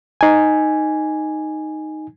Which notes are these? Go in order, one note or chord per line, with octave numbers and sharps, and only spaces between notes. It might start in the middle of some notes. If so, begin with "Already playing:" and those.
D#4 G#5